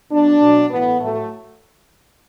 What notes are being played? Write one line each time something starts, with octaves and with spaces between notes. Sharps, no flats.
B2 F#3 D4
B2 F#3
A2 E3 B3
A2 F#3 A3